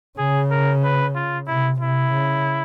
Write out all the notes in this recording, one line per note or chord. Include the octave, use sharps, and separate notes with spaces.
C#3 G#4
A#4
B4
F4
C3 E4
C3 E4
C#3